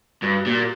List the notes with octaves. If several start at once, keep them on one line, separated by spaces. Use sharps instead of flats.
G2 F#4
A#2 G4